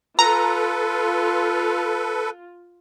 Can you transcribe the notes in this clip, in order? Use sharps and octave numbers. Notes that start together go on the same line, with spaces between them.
F4 A4 B4 A#5